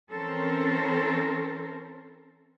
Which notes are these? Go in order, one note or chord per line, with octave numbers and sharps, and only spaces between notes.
E3 C4 C#4 A4 A#4 C5